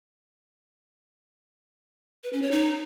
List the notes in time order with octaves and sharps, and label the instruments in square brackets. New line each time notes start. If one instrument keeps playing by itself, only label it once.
[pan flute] B4
C#4
C#5
D#4